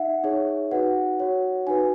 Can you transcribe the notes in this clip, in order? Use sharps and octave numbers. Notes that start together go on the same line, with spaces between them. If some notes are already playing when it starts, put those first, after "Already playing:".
Already playing: D#4 E5 F#5
D#4 G#4 C#5
D#4 F#4 B4 F#5
F#4 C#5
D#4 F#4 B4 G#5